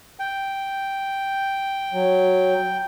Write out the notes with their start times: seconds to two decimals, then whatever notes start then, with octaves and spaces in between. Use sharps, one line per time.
0.19 G5
1.93 F#3